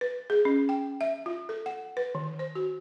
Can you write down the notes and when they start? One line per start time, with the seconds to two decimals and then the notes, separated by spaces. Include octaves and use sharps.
0.01 B4
0.30 G#4
0.45 C#4
0.69 G5
1.01 E5
1.26 F4
1.49 A4
1.66 F#5
1.97 B4
2.15 D#3
2.39 C5
2.55 F#4